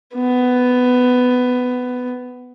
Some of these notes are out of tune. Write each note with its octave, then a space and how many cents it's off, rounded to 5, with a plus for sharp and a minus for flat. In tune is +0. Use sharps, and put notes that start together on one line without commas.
B3 +15